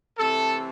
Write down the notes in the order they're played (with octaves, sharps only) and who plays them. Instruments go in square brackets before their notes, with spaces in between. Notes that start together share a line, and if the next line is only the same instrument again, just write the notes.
[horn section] C3 E3 A3 A4